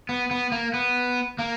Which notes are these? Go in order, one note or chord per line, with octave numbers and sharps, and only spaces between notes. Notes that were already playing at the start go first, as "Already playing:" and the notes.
B3
B3
A#3
B3
A#3